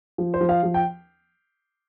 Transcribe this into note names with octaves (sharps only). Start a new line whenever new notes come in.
F3
C5
F3
F5
F3
G5